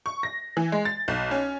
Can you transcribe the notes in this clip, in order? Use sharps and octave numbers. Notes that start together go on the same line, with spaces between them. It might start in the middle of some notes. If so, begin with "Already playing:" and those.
C#6
A#6
E3
G#3
A6
B1
C#4